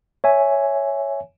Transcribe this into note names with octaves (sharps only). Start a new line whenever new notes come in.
C#5 E5 G#5